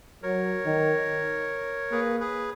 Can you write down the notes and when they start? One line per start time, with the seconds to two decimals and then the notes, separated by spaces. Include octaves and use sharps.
0.23 F#3 A#4 C#5
0.66 D#3
1.91 A#3 G#4 B4
2.20 G#4 B4